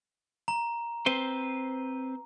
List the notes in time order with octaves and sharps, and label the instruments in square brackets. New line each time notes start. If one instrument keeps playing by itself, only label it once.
[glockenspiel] A#5
[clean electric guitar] C4 B4 C5